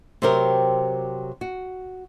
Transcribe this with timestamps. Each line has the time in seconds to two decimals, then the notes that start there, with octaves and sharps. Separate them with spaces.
0.22 C3 F#3 C4 G4 A#4
1.41 F#4